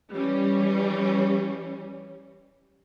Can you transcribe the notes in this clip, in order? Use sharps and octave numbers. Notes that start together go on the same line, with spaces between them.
E3 G3 C#4